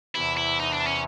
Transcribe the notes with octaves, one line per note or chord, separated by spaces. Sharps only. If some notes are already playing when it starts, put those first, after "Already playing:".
E2 C3 E3 E4
E4
D#4
D4
C#4